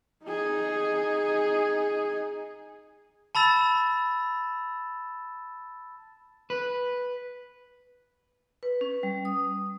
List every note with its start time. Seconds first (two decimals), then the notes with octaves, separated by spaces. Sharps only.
0.25 D#4 G#4
3.35 A5 B5 E6 A6 E7
6.50 B4
8.63 B4
8.81 C#4
9.03 G3
9.25 D#6